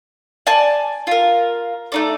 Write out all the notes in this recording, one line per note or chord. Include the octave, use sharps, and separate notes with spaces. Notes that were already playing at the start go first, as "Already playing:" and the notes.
D5 G#5 A5
F4 A#4
A3 D#4 D5